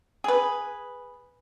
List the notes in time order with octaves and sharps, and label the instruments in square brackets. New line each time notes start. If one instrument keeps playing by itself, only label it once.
[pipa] G#4 B4